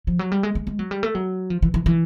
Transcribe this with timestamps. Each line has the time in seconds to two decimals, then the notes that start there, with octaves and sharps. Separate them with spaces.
0.07 F3
0.19 F#3
0.32 G3
0.43 G#3
0.55 G#3
0.67 G#3
0.79 F#3
0.91 G3
1.03 A3
1.15 F#3
1.50 F3
1.62 E3
1.74 E3
1.86 E3